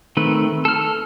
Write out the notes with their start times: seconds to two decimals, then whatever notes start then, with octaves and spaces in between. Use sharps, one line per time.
0.17 D#3 A3 C4 B4
0.65 A4 F6